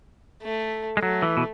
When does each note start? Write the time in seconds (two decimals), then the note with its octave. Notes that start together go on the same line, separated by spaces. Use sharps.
0.43 A3
0.97 G#3
1.03 F#3 A3
1.22 E3
1.37 B2